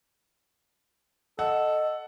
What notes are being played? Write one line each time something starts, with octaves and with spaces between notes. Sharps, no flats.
A4 D#5 F#5